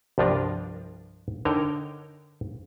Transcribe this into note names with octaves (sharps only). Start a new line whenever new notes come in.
C2 G2 F3 D4 F4 A#4
D3 D#4 A#4 C#5 G5